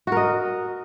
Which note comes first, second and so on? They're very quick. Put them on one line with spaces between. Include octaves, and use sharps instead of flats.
F#4 A#4 D#5